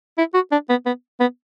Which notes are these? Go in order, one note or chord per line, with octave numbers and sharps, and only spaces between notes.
E4
F#4
D4
B3
B3
B3